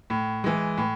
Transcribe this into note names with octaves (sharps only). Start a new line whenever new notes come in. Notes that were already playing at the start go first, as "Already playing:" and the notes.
A2
E3 G#3
A2